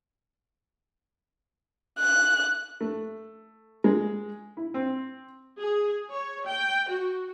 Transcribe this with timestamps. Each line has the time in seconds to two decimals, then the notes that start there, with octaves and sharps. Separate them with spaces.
1.99 F#6
2.81 A3
3.84 G#3
4.57 E4
4.74 C4
5.58 G#4
6.10 C#5
6.47 G5
6.88 F#4